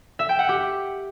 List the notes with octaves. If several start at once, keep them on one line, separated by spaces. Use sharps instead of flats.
E5
G5
F#5
G4